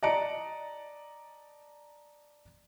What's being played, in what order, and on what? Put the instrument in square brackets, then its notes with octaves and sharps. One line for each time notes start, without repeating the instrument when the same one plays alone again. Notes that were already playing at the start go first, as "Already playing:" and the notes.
[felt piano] D5 D#5 A5 A#5 C#7 D7